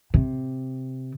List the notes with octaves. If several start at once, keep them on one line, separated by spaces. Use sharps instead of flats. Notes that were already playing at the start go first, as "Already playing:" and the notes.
C3